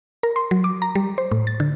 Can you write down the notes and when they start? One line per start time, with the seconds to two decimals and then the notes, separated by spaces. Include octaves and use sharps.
0.23 A#4
0.36 C6
0.51 F#3
0.64 D6
0.82 A#5
0.95 G3
1.18 C5
1.32 A2
1.47 A6
1.60 D3